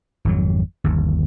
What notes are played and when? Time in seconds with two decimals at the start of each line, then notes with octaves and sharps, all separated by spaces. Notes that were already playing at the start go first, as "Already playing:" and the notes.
0.25 G#1 F2 F#3
0.84 G1 D#2